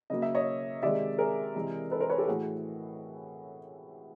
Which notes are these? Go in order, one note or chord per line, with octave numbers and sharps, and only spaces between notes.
C#3 F#3 A#3 D#5
E5
C#5 D#5
C3 D#3 G#3 D5 E5
G#4 A#4
C3 E3 G#3
A4 B4
A#4 C5
B4 C#5
G4 A4
A2 E3 A3 F#4 G#4